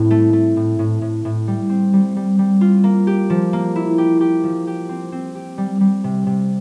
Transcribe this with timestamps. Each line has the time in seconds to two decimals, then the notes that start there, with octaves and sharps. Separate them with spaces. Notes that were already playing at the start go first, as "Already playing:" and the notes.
Already playing: A2 C4 E4
0.11 A3
0.33 A3
0.57 A2
0.79 A2
1.02 A2
1.25 A2
1.47 G3
1.69 C4
1.93 G3
2.16 G3
2.39 G3
2.61 F4
2.84 A#3
3.07 G4
3.30 F3
3.53 A#3
3.75 E4
3.98 G4
4.21 G4
4.44 F3
4.67 G4
4.89 C4
5.12 C4
5.35 G4
5.58 G3
5.81 G3
6.04 C3
6.26 C3